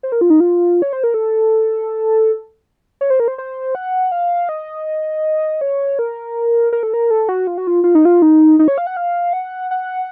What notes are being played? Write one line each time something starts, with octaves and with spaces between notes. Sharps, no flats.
C5
A#4
F4
D#4
F4
C#5
C5
A#4
A4
C#5
C5
A#4
C5
C5
F#5
F5
D#5
C#5
A#4
A#4
A4
A#4
A4
F#4
F4
F#4
F4
F4
D#4
F4
D#4
D#4
C#5
F5
F#5
F5
F#5
F#5